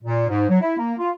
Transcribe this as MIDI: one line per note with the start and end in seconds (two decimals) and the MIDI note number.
0.04 0.24 46
0.28 0.46 44
0.49 0.57 54
0.61 0.75 64
0.78 0.93 58
0.99 1.10 65